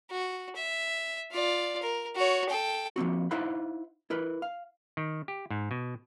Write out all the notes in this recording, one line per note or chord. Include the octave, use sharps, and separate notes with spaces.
F#4
E5
F4 D5
A#4
F#4 C#5
A4 G5
F3 A#3 C4 F#4
D#4 E4 C5 F5 F#5 B5
E4 A#4 B4
F5
D#3
G4
G#2
B2